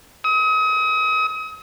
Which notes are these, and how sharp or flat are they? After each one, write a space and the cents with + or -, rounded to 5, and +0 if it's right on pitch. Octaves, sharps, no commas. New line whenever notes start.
D#6 +35